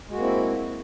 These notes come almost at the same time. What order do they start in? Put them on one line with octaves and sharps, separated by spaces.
G#3 F#4 A#3 C4 E4